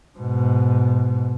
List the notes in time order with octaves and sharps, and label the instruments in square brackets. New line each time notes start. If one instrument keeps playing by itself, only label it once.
[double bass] G#2 B2